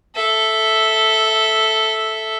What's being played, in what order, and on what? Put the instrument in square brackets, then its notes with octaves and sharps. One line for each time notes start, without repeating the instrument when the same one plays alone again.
[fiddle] A4 E5